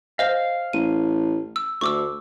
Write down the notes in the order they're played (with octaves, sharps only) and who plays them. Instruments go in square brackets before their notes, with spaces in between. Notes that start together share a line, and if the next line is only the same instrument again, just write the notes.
[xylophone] C5 D#5 [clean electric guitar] F5
[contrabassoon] A1 [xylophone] D#7
[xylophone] E6
[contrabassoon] D2 [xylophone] C#6 D6 E6